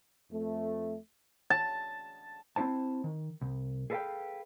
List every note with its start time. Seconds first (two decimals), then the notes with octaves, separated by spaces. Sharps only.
0.31 F2 A3
1.50 A5
2.56 C4 D#4 E4 C5 A5
3.04 D#3
3.41 C2
3.90 G#4 A4 B4 D5 F5 G5